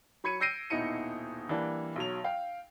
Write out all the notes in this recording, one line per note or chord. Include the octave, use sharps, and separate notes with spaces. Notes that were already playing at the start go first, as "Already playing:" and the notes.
F#3 B5 G#6 C#7 D#7
E6 G6 A#6 C7 D7 D#7
D#1 B2 D#4 E4 C#7 D#7
E3 G3 A#3 D4
B1 F#3 F7
F5 G5